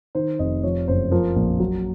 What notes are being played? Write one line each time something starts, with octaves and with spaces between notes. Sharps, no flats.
D#3 C5
F1 D#5
F3 C#5
F#1 C5
F3 A#4
A#1
F#3